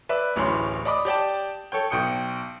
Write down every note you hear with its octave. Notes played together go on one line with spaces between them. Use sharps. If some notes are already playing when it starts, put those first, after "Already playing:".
B4 D5 E5
D1 A1 C#4 B5 C6
D5 D#5 B5 D6 D#6
G4 D5 G5 A5
A4 C#5 G5
B1 G5 D#6 C#7